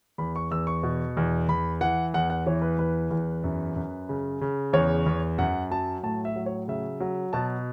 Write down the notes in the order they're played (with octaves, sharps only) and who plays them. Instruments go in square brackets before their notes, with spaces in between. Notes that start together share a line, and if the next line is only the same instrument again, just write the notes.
[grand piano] E2 B5
C#6
E2 E6
C#6
B2
E2
E2 B5
E3 F#5
E2 F#5
F#5
E3 C#5
B4
E2 B4
E2
F#2
F#2
C#3
C#3
E2 C#5
E2
F#2 F#5
F#3 A5
A2 A5
E5
F#3
C#5
C#3 E5
F#3
B2 A5